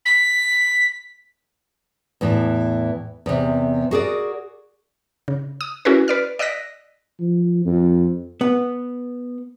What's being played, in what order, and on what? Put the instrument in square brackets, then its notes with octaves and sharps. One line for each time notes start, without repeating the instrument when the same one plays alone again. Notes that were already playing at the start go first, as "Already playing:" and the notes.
[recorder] B6
[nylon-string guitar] E2 A2 E3
E2 C3
F#4 G#4 A#4 D5
[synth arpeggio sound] C#3
D#6
C#4 E4 F#4 G#4 A#4 B4
B4 D5 F6
D5 D#5 E6 F#6 A#6 B6
[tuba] F3
F2
[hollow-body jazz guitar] B3